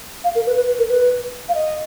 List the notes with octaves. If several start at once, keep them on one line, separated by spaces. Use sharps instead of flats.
F5
A#4
B4
B4
B4
A#4
B4
F5
D#5